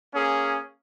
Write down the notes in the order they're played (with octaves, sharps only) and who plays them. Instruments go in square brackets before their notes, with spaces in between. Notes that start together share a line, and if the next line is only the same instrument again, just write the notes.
[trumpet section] A#3 C#4 G#4